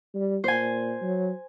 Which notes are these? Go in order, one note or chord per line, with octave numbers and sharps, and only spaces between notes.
G3
A#2 C5 G#5
F#3